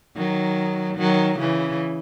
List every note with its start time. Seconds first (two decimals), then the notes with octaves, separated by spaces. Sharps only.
0.17 D#3 F#3
0.98 D#3 F#3
1.39 C#3 E3